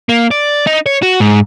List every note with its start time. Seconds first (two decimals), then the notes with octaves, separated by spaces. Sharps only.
0.09 A#3
0.31 D5
0.67 D#4
0.86 C#5
1.02 F#4
1.20 G#2